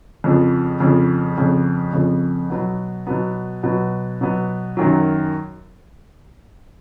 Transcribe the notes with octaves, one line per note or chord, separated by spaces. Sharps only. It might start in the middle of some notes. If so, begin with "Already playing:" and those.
F2 C#3 F3
F2 C#3 F3
F2 C#3 F3
F2 C#3 F3
B2 F#3 B3
B2 F#3 B3
B2 F#3 B3
B2 F#3 B3
F#2 D#3 F#3